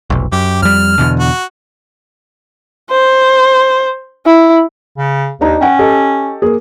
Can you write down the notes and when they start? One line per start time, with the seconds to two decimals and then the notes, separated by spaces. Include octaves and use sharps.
0.10 F1 B1
0.32 F#2 G4
0.62 F2 G3 F6
0.98 E2 B2 D3
1.20 F#4
2.90 C5
4.26 E4
4.98 C#3
5.41 D#2 D4 D#4 A#5
5.61 C#4 F#5 G5
5.79 G4 A4 D#5
6.42 A#3 G#4